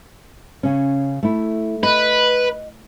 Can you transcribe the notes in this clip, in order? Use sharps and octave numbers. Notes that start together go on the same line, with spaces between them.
C#3 C#4
A3 E4
B4 D#5